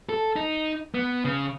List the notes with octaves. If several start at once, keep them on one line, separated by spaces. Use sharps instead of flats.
A4
D#4
B3
C#3